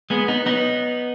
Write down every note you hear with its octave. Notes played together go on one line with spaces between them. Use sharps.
G#3 B3
B3 D#4
B3 D#4